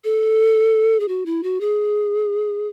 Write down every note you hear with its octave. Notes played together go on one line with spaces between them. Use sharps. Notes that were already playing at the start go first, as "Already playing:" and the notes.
A4
G#4
F#4
E4
F#4
G#4